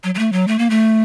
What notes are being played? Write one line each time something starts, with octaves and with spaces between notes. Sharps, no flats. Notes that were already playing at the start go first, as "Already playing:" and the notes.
F#3
F#3
A3
F#3
A3
A#3
A3